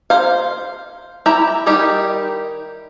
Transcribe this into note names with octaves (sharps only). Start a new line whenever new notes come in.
C5 F5
E4 G4 G5 A#5
D#3 G3 D#4 E4 G4